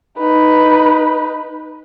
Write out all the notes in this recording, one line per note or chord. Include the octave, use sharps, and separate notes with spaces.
D#4 B4